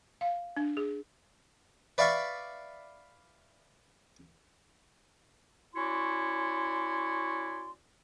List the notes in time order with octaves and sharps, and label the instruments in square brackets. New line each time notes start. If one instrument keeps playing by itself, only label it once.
[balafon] F5
D4
G#4
[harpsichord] B4 D5 E5 F5 A5 C#6
[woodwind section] C#4 E4 F#4 C#5 D5 C6